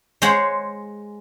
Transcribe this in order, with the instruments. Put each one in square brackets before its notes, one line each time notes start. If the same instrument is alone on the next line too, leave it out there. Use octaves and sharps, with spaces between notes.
[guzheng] G#3 C5 C#5 F#5